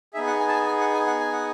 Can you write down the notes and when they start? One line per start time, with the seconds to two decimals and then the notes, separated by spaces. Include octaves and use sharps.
0.14 B3 D#4 G#4 E5
0.27 F#5
0.40 G#5
0.49 A5
0.54 G#5
0.66 G#5
0.80 F#5
0.94 G#5
1.07 F#5
1.20 G#5
1.33 F#5